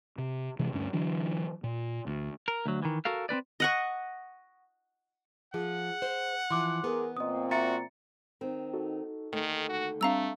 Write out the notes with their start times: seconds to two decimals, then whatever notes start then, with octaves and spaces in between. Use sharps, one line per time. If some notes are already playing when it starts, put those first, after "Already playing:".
0.18 C3
0.59 C3 E3 G#3
0.73 D2 G2 C#4
0.93 D3 E3 F#3 D4
1.64 A#2
2.07 D2
2.48 A#4
2.66 D2 F#3
2.83 D#3 E3
3.05 F#4 A4 A#4 F5
3.29 C4 C#4 B4 D5
3.60 D#5 F#5 C#6
5.54 F3 G#4 F#5
6.02 C5
6.50 E3 F3 C6 D6 F#6
6.84 B3 G#4 A#4
7.17 A#2 C4 D#5 D#6
7.51 F#4 E5 A#5 A6 C#7
8.41 D#3 C4
8.73 D#4 F#4 A4
9.33 D#2 D3 D#3 A3 G#5
9.69 F#4
10.01 G3 A3 C4 D4 F5 A#5 E6